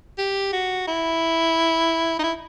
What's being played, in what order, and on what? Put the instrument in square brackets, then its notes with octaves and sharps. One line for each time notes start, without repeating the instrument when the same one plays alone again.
[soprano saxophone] G4
F#4
E4
D#4
E4